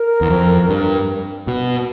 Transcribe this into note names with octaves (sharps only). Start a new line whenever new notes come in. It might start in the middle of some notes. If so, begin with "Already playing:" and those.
Already playing: A#4
E2
F2
G2
B2